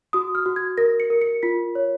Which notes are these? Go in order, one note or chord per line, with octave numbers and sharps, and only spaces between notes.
F#4 D#6
F6
F#4
G#6
A#4 A#6
C#7
A#4
C#7
F4 B6
C#5